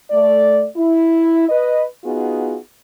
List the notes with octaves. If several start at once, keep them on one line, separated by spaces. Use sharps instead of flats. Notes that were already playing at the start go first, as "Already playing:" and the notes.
A3 D5
E4
B4 D#5
B3 D#4 F4 F#4 G#4